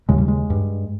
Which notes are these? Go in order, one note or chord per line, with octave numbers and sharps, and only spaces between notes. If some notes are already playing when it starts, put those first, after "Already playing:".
D#2 C#3 G#3
G3
G#3
G2